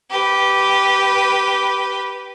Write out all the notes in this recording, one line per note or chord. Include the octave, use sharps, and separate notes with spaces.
G4 B4